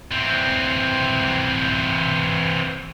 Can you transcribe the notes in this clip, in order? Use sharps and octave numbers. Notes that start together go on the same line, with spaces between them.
E3 C4